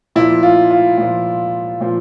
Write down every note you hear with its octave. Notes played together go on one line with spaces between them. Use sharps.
A#2 F3 E4
F4
F4
A#2 F3
A#2 F3